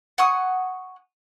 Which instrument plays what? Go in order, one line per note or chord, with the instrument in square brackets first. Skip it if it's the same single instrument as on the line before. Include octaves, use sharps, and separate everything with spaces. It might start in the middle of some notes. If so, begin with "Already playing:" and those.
[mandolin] F#5 G#5 C#6 D#6